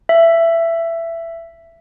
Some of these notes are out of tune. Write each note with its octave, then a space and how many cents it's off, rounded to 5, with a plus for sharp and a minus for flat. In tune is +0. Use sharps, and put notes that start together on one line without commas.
E5 +20